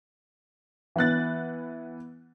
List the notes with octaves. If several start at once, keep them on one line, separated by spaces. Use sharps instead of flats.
E3 B3 F#6 A6